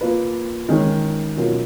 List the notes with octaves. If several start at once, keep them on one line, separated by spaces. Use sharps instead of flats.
A#3 F4 B4
D#3 G#3 C#4
B2 F#3 C#4 F4 A#4